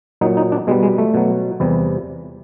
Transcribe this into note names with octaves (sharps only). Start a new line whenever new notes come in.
A#2 F#3 D#4
D#4
D4
B2 G3 G#3
G#3
A3
B2 F#3
E2 C3 E3 G3